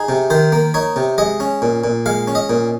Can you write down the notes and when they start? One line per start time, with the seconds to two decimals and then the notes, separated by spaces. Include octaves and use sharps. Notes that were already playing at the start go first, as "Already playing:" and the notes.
Already playing: D#4 G#4
0.09 C3
0.30 D#3 C5
0.52 A#3
0.74 D#4 C#5
0.96 C3
1.18 G#3 D#5
1.40 C#4
1.62 A#2
1.84 A#2
2.06 G#3 F5
2.28 C#4
2.35 D#5
2.50 A#2